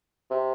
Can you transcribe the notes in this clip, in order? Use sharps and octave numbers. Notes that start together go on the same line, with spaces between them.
C3